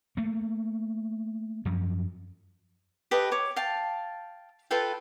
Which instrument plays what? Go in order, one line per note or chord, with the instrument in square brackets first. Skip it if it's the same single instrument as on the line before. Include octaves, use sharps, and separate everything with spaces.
[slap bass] A3 A#3
F#2 F3
[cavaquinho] G4 A4 B4 D#5
C#5 D6
F5 G5 A5
F4 A4 B4 G5